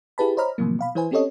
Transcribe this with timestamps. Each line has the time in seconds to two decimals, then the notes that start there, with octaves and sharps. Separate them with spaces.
0.18 E4 G4 G#4 B4 A5 B5
0.37 C5 C#5 D#5 A#5 B5 F6
0.58 A2 C3 D#3 F3 F#3 A#3
0.79 B2 F5 B5
0.95 E3 E4 B4 C5 G#5
1.11 C4 C#4 G4 A4 C#5 D#5